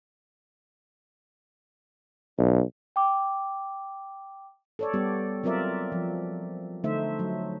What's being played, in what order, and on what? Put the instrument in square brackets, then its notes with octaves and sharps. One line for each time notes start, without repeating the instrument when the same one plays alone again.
[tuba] B1
[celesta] G5 D6
[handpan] A4 C#5 D5
G3 B3 G4
F#3 C4 F4 A#4 D5 E5
F3
D3 A3 D#4 C5 E5
F#3